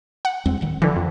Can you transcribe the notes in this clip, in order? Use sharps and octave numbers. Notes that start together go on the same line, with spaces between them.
F#5
E2 G#3 C4
D1 D#3
D3 E3 F3
F2